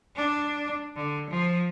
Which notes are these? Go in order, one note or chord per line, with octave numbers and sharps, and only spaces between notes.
D4
D3
F3